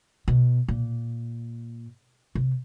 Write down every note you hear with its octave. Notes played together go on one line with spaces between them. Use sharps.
B2
A#2
C3